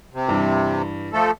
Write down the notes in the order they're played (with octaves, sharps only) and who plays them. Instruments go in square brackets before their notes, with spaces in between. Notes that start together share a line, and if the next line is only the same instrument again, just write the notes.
[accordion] C3
[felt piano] G2 E3
[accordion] F3 A3 A4